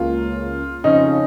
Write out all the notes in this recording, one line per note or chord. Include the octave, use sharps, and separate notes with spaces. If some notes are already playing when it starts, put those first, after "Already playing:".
Already playing: C#2 C#3 A#3 F4
F2 C#3 F3 C#4 D#4